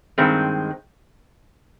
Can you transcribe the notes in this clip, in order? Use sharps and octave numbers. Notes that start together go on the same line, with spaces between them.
G2 D#3 G#3 C4